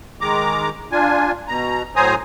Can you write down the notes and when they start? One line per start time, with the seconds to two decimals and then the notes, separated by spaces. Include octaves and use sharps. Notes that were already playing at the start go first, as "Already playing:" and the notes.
0.21 D#3 G#3 A#5 D6
0.91 D4 F4 G#5
1.48 B2 A#5
1.96 A2 F#3 C5 G#5 A#5 D#6